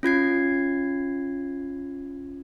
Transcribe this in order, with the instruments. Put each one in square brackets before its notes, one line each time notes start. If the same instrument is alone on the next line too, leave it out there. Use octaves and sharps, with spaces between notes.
[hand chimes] C#4 F4 G#6 C7